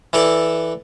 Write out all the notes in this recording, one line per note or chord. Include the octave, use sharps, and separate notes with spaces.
E3 A4 D5 A5